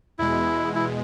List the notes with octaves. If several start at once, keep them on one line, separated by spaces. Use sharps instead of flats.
E2 B2 G#3 E4
E4